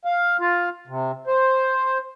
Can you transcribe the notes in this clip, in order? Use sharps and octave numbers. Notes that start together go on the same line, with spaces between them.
F5
F4
C3
C5